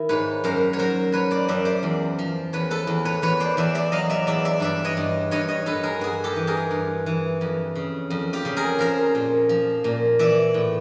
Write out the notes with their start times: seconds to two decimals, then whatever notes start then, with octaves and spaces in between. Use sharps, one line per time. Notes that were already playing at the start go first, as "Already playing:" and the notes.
Already playing: D#3 E4
0.09 G#2 B4 C#5
0.44 F#2 A#4 C5
0.73 C#5
0.79 F#3 A#4 C5
1.12 F#3 B4 C#5
1.31 C5 D5
1.48 F#2 D5 E5
1.65 C5 D5
1.83 E2
2.19 F3
2.53 E2 B4 C#5
2.71 A4 B4
2.87 E2
3.05 B4 C#5
3.22 E2 B4 C#5
3.40 C5 D5
3.57 E2 D5 E5
3.75 D5 E5
3.92 F#3 D#5 F5
4.10 D5 E5
4.27 E2 D5 E5
4.45 D5 E5
4.60 G2 D5 E5
4.84 C#5 D#5
4.97 G2
5.31 G2 C#5 D#5
5.48 C#5 D#5
5.66 G2 A4 B4
5.83 G#4 A#4
5.99 G2 F#4 G#4
6.24 G4 A4
6.36 E3
6.47 G#4 A#4
6.71 G2
7.06 E3
7.41 F2
7.75 C#3
8.10 F2
8.33 F4 G4
8.45 C#3
8.57 G#4 A#4
8.79 F3 A#4 C5
9.15 A#2
9.49 F3
9.84 A#2
10.19 E3 D5 E5
10.54 A2